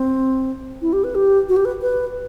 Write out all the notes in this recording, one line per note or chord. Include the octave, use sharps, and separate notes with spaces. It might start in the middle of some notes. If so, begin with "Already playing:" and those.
Already playing: C4
E4
G4
B4
G4
F#4
G4
B4
B4